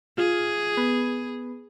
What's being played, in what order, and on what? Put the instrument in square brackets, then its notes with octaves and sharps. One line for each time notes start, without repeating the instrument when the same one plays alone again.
[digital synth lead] F4 [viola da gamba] G#4
[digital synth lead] B3